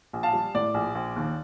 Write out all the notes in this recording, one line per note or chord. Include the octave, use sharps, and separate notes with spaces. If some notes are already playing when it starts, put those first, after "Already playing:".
A#1
F5 A5
G3
A2 D5
A#1
A#1
D#2